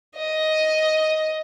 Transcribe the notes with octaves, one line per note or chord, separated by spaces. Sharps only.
D#5